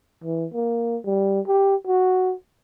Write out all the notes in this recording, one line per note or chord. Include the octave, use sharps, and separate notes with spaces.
E3
A#3
G3
G4
F#4